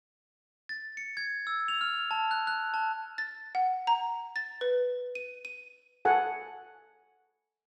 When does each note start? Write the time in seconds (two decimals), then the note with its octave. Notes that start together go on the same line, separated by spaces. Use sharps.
0.69 A6
0.97 C#7
1.17 G#6
1.47 E6
1.68 F7
1.81 F6
2.11 A5
2.31 F#6
2.47 F#6
2.74 A5
3.18 A6
3.55 F#5
3.87 A#5
4.36 A6
4.61 B4
5.15 D#7
5.45 D#7
6.05 A4 F#5 G#5